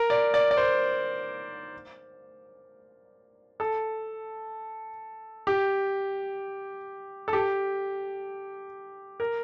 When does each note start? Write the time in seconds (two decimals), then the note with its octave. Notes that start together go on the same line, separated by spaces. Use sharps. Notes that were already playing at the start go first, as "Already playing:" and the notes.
Already playing: A#4
0.10 D5
0.34 D5
0.51 D5
0.57 C5
3.60 A4
5.47 G4
7.28 A4
7.33 G4
9.20 A#4